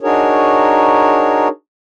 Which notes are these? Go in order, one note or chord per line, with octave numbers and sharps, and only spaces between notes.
D4 D#4 F#4 G#4 A#4 C#5